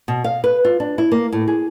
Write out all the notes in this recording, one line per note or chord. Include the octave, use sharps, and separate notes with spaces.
B2
F5
B4
F4
D4
E4
A#3
A2
G#4